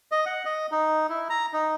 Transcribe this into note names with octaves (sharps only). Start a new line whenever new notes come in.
D#5
F#5
D#5
D#4
E4
A#5
D#4